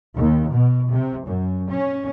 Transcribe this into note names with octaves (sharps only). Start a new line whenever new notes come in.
D#2
B2
C3
F#2
C#4